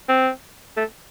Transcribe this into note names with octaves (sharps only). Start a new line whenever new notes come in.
C4
A3